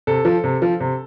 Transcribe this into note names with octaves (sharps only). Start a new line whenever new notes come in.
C3 A4
F3
C3
F3
C3